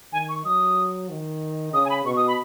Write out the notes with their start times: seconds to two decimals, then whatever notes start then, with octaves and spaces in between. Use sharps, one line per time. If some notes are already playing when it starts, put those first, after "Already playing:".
0.13 D#3 G#5
0.29 C#6
0.45 F#3 D#6
1.10 D#3
1.73 C#3 D#6
1.85 G#5
1.90 B5
2.05 B2 C#6
2.17 D#6
2.28 B5